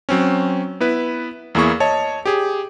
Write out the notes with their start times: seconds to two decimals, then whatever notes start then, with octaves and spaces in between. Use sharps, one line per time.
0.09 F#3 C4 C#4
0.80 B3 E4 B4
1.55 E2 A#3 E4 G#4 C#6
1.80 C#5 D#5 A5
2.26 G4 G#4